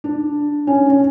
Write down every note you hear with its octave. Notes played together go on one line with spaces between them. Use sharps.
D4
C#4
C#4